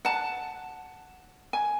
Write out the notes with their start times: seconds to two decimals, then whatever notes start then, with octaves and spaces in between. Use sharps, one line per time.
0.05 F#5 A5
1.53 G#5